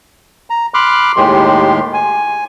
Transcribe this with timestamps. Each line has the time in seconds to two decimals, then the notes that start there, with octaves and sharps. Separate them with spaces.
0.50 A#5
0.74 B5 C6 D6 F6 F#6
1.17 D#2 A2 D#3 G#3 G4 C6
1.94 G#5